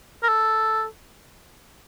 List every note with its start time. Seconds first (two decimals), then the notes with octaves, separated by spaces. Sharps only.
0.23 A#4
0.29 A4